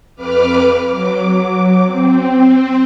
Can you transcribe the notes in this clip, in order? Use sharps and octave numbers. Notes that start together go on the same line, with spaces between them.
F2 B4 D6 F6
F#3 D6
C4